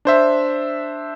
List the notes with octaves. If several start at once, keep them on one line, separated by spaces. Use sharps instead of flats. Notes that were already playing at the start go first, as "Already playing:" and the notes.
D4 C5 E5